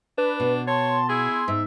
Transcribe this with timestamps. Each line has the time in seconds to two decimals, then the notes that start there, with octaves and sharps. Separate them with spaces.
0.18 D4 B4
0.40 B2
0.67 C#5 A5 C6
1.09 E4 G#4
1.48 G#2 E5